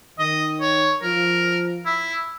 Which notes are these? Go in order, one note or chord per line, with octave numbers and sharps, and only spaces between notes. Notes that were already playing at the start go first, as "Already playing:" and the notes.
D#3 D#5
C#5
F3 A#4
E4